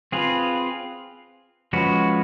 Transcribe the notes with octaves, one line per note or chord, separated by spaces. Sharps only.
C4 F4 G#4 B4
F3 G#3 C#4 F#4 B4